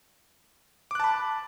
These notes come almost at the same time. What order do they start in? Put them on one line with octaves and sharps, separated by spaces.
D6 F#6 A5 B5